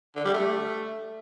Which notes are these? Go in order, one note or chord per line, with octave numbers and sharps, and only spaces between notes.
D3
G3
A3